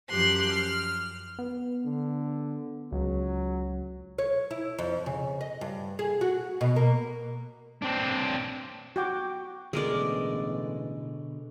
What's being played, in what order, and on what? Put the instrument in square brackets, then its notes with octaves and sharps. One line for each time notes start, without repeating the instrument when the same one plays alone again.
[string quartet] F#2 F3 G4 C6 F#6
F6
[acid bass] B3
[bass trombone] D3
[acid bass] C#2 [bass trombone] F#3
[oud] C#5
E4
F2
C#3
D#5
G2
G#4
F#4
B2
A#3
[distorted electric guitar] C4 D4
[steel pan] F#4 G5 D6
[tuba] A1 [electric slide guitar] B2 D3 [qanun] G#3 A#4 D5